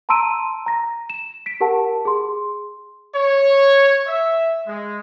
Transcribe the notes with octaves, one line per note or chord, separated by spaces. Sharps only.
A5 A#5 C6 E6 D7 D#7
A#5 A#6
E7
B6 D7
G4 A#4 F#5 A5
G#4 C6
C#5
E5
G#3